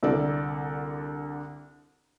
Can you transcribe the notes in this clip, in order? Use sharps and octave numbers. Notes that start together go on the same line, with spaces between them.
C2 D3 A4 D5